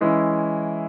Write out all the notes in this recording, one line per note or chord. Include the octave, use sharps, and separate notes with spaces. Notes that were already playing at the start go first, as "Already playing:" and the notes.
E3 G#3 C#4 E4